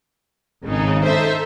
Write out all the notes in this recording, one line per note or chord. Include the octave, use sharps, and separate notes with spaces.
G#1 C#3 D#4
D#4 A4 C5 E5